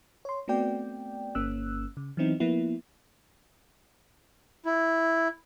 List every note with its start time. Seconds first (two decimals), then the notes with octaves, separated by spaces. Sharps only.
0.25 C#5 C6
0.48 A3 B3 C4 F#4 D5 G5
1.35 G1 A#3 C#4 E6 F#6
1.97 C#3
2.17 E3 F#3 B3 C4 D#4 E4
2.40 F3 A#3 B3 E4
4.65 E4